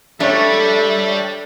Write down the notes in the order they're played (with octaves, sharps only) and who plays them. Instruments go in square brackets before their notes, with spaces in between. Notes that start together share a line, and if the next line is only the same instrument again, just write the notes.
[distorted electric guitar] G3 [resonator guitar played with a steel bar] A3 [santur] D4 C#5 [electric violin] A4 E5